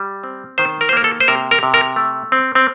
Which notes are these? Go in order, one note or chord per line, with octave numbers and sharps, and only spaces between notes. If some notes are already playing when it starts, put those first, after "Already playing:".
Already playing: G3
C4
D#3 C5
A#4
C5
A#3 A#4
A4
C5
C3 A#4
A#4
C3
A#4
A3
C4
C4